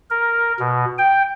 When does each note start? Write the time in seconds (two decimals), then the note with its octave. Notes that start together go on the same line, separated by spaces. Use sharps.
0.10 A#4
0.60 B2
0.98 G5